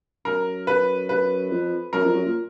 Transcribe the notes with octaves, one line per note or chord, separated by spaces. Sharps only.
F#2 A#4
B4
B4
F2
F#2 A#4
F2
F#2
A#2